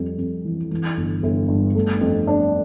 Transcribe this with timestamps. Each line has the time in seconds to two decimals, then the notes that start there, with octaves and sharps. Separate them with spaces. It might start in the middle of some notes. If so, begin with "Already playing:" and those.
Already playing: F2 G3
0.19 F2
0.45 E3
0.71 E3
0.97 G1
1.23 G1
1.48 G2
1.75 A3
2.01 F2
2.27 D4